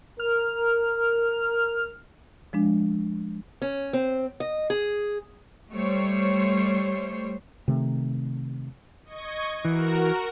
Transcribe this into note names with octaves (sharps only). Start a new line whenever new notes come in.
A#4 F6
F3 G#3 D4
C#4
C4
D#5
G#4
G3 A3 C5 C#5
C3 D#3 A3
D#5 C#6 G#6
E3 F#4 A#4